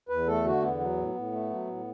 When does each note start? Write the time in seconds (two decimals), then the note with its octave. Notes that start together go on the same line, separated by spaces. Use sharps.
0.09 E2 B4
0.27 A3 A4
0.44 D3 F#4
0.62 E2 B3
0.80 F#3
0.97 A2
1.15 A2
1.32 A3
1.50 F#3
1.67 A2